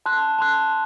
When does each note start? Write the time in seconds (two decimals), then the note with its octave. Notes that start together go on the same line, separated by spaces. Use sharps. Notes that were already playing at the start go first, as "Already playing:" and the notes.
0.06 A5 C6 F#6
0.39 A5 C6 F#6